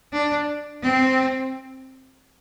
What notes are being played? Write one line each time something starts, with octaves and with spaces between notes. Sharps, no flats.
D4
C4